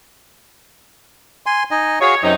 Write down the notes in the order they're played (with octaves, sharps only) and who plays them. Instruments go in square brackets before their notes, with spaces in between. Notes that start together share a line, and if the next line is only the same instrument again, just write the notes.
[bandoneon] G#5 C6
D#4 D#5 G#5
[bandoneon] F#4 G#4 F5 [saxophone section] C#5
[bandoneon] F#2 F#3 [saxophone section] C3 D#4